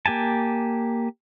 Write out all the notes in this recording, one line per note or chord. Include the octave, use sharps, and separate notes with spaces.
A#3 G4 G#5 A5